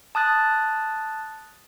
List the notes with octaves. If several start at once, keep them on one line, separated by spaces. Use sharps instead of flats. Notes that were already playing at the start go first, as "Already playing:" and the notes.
A5 D#6 F#6 A6